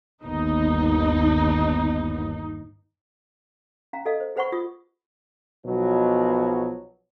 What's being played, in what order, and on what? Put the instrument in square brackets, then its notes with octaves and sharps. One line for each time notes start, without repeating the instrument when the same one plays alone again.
[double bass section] G1 D#2 B3 [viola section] D#4
[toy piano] C#4 F5 A#5
A4 B4 D#5 F5
C5
G#4 B4 C5 F#5 B5 C#6
F4 D#6
[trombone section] B1 B2 F3 F#3 F#4